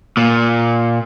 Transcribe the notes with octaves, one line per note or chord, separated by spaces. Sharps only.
A#2